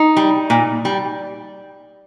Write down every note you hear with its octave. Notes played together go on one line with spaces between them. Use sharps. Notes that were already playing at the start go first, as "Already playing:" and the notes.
Already playing: D#4
G3
A#2
G3